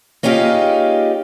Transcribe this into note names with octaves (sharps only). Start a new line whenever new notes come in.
A#3 C#4 D#4 F4 G4 G#4